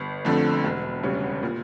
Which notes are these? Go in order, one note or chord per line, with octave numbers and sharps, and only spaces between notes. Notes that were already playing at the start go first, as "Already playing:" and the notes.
Already playing: G1
F2 D3 F3 A3
E1
D2 C#3 G3 C#4
A#2